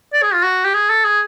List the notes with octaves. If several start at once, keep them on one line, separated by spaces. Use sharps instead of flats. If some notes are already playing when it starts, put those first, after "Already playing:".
D5
G#4
F4
F#4
G4
G#4
A4
G#4